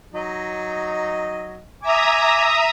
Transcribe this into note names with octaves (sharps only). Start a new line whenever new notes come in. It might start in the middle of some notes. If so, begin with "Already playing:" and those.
F#3 D#4 D#5
E5 G#5 A#5 D6 D#6